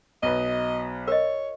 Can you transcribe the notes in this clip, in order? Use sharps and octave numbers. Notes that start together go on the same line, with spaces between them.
B1 B4 D#5
A#4 C#5 D#5